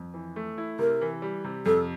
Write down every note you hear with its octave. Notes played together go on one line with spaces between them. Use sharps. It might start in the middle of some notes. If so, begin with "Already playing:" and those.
Already playing: F2
E3
A3
E4
C3 A#4
E3
G3
C3
F2 A4